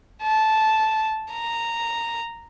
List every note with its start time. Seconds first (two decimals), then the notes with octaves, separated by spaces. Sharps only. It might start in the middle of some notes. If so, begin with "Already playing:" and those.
0.23 A5
1.32 A#5